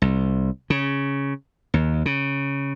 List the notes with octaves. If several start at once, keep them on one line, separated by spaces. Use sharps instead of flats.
C2
C#3
D#2
C#3